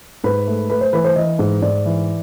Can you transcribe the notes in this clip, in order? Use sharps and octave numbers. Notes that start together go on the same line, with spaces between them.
G#2 B4
A3
A3 B4
C5
E3 B4
C5
E3 D#5
G#2
G#2 D5
E3